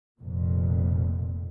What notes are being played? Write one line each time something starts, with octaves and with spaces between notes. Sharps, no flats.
F1 F2 A#2